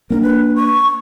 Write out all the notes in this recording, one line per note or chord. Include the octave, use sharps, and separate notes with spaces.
A#3 B3 D4 A#4
B4
C#6